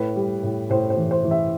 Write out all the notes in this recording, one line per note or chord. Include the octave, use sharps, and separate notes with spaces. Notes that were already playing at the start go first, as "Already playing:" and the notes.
Already playing: A2 B4
G3
A2
A2 C5
C5
E3
C5
E3
E5